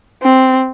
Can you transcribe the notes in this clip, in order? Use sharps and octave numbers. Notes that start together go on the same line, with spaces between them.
C4